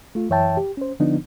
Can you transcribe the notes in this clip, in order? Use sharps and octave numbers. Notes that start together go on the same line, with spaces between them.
A3 F4
F#2 E3 C#5 E5 G5 A5
G4
C#4 C5
D3 F3 B3 D4 D#4